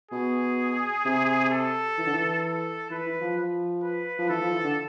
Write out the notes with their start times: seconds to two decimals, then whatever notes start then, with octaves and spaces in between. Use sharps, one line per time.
0.11 B2 G#4
1.05 C3
1.51 A4
1.98 E3
2.06 D3
2.13 E3
2.44 A4
2.90 E3 B4
3.06 E3
3.21 F3
3.37 F3
3.83 B4
4.18 F3
4.29 E3 A4
4.41 F3
4.53 E3
4.64 D3